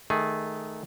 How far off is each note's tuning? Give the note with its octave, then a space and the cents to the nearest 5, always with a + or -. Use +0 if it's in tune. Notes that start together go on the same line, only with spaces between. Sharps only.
D#3 +0 A3 -15 G#4 +0